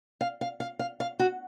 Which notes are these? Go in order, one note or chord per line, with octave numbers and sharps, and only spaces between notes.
F5
F5
F5
F5
F5
F#4